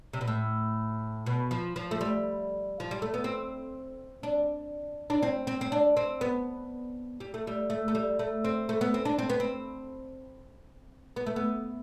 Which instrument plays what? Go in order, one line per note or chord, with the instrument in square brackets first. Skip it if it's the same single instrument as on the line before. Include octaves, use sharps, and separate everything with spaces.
[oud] C3
B2
A2
B2
F3
F3
A3
G3
F3
G3
A3
B3
C4
D4
D4
C4
C4
C4
D4
C4
B3
G3
A3
G3
A3
A3
G3
A3
C4
A3
B3
C4
D4
C4
B3
C4
B3
A3
B3